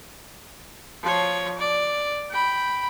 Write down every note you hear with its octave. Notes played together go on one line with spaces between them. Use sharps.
F3 C#5
D5
G5 B5